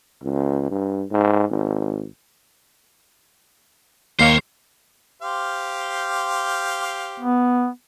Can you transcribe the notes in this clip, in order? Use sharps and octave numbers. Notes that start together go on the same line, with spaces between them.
C#2
G2
G#2
G#1
D#2 A#3 C5 C#5 F5 C7
G4 C5 F5
B3